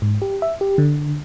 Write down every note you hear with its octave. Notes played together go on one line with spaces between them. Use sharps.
G#2
G4
E5
G4
D3